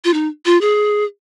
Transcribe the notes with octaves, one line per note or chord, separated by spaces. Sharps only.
F4
D#4
F4
G#4